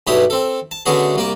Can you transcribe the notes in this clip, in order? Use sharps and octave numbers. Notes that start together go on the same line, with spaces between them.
B1 G2 B2 E4 G4 D#6
C4 A4
A5
D3 A3 B3 C#4 F#4 G#4
C2 A#3 D5